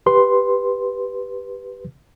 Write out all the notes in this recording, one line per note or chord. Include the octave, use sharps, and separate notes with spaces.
G4 B4 C6